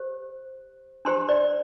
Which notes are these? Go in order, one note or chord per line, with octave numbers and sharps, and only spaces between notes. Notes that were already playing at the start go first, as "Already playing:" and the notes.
Already playing: G4 C5
D4 G4 C5 C6
D5